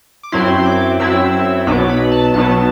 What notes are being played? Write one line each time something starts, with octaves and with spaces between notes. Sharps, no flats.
D6
F#2 F#3 C4 E4 C6
D6
F#2 F#3 C4 E4 E6
B1 B2 F#3 B3 D6
B5
A5
B1 B2 F#3 B3 A5